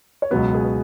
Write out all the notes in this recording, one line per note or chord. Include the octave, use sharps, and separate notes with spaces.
C#5
C#2 B2 F#3 B3 B4
G#4
B4